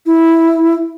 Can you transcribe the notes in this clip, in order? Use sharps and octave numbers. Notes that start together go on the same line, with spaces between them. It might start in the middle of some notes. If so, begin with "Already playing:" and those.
E4